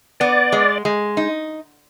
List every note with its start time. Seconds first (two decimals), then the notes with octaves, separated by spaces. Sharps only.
0.20 B3 D5
0.52 G#3
0.85 G#3
1.17 D#4